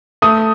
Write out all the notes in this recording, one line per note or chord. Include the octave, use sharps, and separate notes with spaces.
A3 D#6